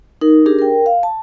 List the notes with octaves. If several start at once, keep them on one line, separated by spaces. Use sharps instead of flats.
D#4 A#4
D4 G4 G#4 A#4
A#4 G5
F5
A5